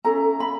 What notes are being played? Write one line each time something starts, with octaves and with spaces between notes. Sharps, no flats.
C#4 E4 A4 A#5
B5